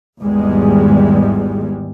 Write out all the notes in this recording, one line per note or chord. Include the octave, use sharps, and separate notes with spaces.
G#1 E2 G3 G#3